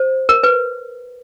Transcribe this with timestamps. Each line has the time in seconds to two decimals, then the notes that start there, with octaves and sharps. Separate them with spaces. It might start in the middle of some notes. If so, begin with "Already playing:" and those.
Already playing: C5
0.29 A#4
0.43 B4